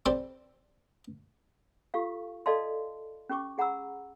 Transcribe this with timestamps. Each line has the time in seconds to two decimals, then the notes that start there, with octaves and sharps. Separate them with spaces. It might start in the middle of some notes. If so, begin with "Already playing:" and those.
0.06 G3 C4 A4 C5 D5
1.94 F4 G4 A4 F5 C#6
2.46 A4 D5 D#5 F5 A5 C6
3.29 C#4 G4 C#6 D6
3.58 G#4 F#5 A#5 B5 E6